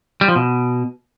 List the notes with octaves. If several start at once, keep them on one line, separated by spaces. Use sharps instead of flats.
G3
F3
B2